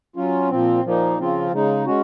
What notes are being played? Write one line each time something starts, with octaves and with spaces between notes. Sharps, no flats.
F#3 C#4 F4
A#2 F3 C4
A#2 F3 A#3 D#4
C#3 F3 C4 F4
C#3 G#3 D#4
G#3 C#4 F#4